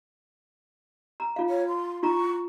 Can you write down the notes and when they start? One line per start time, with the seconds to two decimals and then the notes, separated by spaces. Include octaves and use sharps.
1.20 A#5
1.36 F4 F5
1.50 C#5
1.68 C6
2.03 E4 F4 A#5 C#6